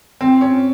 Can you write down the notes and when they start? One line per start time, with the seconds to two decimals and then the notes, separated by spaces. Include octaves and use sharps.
0.21 C4
0.41 C#4